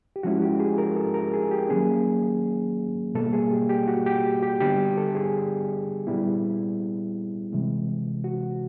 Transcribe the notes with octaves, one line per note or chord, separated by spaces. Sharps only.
G4
F3 G#3 C#4 E4 F#4
G4
G#4
A#4
A4
A#4
G#4
G4
D#3 F#3 A#3 C#4 G#4
B2 G3 A#3 A4
G#4
G4
G4
F#4
G4
G4
D3 G3 B3 D4 G4
A4
G#4
A#2 G3 B3 E4
C3 E3 G#3
F#4